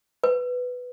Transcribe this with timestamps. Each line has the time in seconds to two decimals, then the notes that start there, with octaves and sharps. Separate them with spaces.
0.24 B4